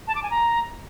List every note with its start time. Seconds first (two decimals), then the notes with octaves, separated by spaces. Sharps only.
0.08 A5
0.15 D6
0.23 G#5
0.31 A#5